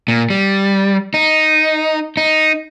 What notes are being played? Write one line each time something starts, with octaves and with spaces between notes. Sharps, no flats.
A#2
G3
D#4
D#4